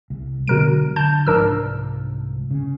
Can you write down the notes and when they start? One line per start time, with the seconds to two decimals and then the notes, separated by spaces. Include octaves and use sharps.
0.10 C2
0.48 B2 D3 F#3 G#3 A#4 D7
0.96 D3 A5 G6
1.26 C2 G#2 F3 D4 A#4 E6
2.51 C#3 C#4